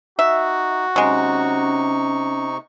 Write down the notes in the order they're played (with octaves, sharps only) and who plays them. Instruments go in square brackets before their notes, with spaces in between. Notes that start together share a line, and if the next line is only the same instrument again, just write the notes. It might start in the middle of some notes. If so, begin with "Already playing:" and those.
[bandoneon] D#4 [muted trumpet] F#4 [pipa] E5
[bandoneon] C3 D#4 C#6 [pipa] F#3 G#3 [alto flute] C#4